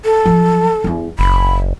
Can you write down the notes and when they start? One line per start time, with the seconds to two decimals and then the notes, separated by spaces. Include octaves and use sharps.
0.05 A4
0.26 F3 F#3
0.84 E2 G2
1.19 F#1 D4 B5